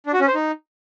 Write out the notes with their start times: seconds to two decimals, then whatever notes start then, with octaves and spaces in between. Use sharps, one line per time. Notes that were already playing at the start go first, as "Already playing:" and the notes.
0.06 D4
0.14 F#4
0.21 C#4
0.28 C5
0.35 D#4